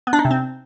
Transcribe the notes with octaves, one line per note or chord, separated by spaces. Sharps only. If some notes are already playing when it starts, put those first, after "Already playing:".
B3
D4
D#4
C3
C4